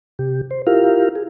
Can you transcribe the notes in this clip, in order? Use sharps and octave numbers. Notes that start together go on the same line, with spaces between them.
C3 G4
C5
E4 F4 G4 A#4 F5
G#4